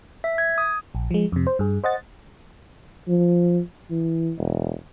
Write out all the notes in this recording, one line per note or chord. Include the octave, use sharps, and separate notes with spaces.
E5
G#6
D#6
A#1
F3 G#3
F2 C3
C5
G2 G#4
C5 D#5 F#5 A6
F3
E3
E1